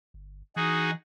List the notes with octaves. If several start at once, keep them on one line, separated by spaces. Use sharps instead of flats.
G1
E3 D#4 F#4 G#4